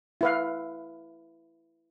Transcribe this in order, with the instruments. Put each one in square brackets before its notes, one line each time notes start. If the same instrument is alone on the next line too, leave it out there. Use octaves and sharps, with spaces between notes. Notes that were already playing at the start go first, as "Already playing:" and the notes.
[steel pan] E4 B4 F5